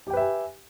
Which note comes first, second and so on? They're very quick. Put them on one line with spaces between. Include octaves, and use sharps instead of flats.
G4 G5 B4 E5 G#5